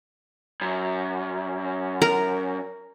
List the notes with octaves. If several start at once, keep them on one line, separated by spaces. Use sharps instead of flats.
F#2
A#4